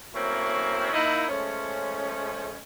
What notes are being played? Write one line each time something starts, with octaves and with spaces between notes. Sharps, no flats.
F#3 A3 A#3 C4 C#4 E4
A#3 D#4 E4
F3 G#3 A3 C#4